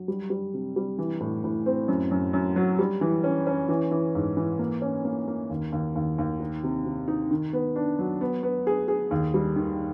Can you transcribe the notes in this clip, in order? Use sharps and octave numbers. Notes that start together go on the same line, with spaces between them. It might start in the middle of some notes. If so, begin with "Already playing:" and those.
Already playing: F#3
G3
G3
C3
G3
E3
A2
A2
C4
F#2
F#2
F#2
F#3
G3
E3
C#4
C#4
E3
E3
G#2
E3
A#3
C#4
A#3
A#3
D#2
D#2
D#2
D#2
D#4
C3
C3
D#4
D#3
B3
D4
F#3
B3
B3
G#4
G#4
D#2
G3
D#3